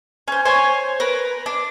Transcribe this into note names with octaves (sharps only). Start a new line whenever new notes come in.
C#4 C5
C5 C#5 G#5
A#4 B4
D4